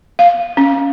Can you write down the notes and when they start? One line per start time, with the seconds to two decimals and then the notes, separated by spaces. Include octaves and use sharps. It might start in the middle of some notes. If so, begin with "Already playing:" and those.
0.19 F5
0.57 C#4